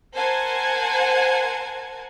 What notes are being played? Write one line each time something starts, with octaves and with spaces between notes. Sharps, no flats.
A#4 C5 F#5 G#5 A5 G#6